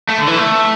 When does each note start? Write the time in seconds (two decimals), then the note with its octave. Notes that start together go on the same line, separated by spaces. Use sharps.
0.09 A3
0.18 D3
0.27 E3
0.37 A3